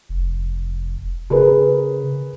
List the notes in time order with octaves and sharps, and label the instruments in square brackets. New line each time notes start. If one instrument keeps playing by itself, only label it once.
[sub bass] F1
[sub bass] C#3 [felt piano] G#4 A#4 B4